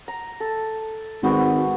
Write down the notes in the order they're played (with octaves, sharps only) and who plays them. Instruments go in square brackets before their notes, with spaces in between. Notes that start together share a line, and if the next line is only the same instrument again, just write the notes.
[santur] A#5
A4
[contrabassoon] G#1 [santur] B3 F#4 C5